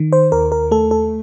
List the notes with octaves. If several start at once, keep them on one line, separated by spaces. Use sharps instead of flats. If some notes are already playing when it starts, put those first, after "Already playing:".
Already playing: D#3
C5
D#2 A#4
A#4
A3 A4
A4